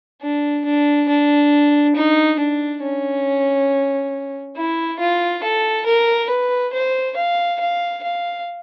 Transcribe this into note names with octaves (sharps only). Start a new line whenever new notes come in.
D4
D4
D4
D#4
D4
C#4
E4
F4
A4
A#4
B4
C5
F5
F5
F5